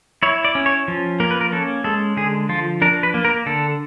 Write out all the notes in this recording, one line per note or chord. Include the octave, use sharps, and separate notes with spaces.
E4 C#5
D5
C#4
C#5
F3
A#3 A#4
B4
A#4
C#4 A4
G#3 A4
D3 G#4
F3 F4
D4 A#4
B4
A#3
A#4
D3 A4